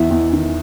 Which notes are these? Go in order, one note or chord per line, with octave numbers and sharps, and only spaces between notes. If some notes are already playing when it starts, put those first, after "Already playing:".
Already playing: E2 E3 E5
E2
D#3